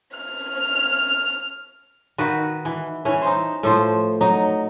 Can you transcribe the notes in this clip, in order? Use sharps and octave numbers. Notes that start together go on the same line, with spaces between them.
F6
D#3 F#4 B4
E3
E3 C#4
D#4 C5
A2 F3 C5
F#3 D#4